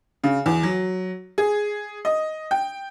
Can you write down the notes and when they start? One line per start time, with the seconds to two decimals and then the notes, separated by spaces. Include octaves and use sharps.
0.24 C#3
0.46 E2
0.63 F#3
1.38 G#4
2.05 D#5
2.51 G5